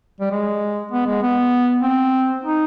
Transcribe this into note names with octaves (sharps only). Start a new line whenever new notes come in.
G3
G#3
B3
G#3
B3
C4
D#4